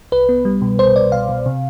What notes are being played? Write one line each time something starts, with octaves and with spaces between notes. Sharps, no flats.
C2 B4
B3
G3
B2
C2 C5
C2 D5
B2 F5
B2
C3